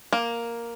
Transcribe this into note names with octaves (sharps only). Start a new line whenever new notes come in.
A#3